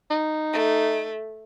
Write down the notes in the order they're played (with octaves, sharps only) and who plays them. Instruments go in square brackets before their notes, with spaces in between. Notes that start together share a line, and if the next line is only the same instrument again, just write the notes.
[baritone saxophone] D#4
[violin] A3